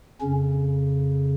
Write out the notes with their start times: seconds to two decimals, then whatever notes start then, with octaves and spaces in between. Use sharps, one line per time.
0.21 F2 C#3 C#4